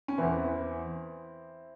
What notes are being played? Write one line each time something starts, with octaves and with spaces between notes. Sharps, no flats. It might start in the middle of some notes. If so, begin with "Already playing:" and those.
C#4
E2 E3 C4 E4